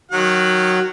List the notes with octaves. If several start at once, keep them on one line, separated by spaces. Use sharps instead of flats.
D#3 F#3 F#5